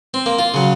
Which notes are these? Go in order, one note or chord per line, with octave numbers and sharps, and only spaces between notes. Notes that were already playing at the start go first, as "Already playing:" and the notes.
C4
A#3
F4
C#3 F#3